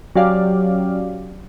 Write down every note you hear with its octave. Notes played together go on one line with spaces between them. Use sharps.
F#3 C#4 G4 D5 F5